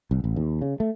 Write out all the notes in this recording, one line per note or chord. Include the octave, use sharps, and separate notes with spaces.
C2
A1
D#2
C#3
A3